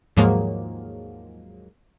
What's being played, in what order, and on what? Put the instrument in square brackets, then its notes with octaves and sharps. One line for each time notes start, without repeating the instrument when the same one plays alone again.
[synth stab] D#2 G#2 F3 F#3 G#3 A#3